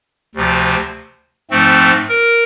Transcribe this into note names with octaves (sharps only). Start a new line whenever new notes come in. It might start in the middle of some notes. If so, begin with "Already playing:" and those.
D2 C3 F3
G#2 F3 A3 C4
A#4